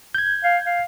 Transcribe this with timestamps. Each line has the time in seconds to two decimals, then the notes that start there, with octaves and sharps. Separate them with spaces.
0.15 G6 G#6
0.44 F5
0.66 F5